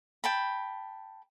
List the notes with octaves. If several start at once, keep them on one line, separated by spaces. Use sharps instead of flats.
G5 A5 B5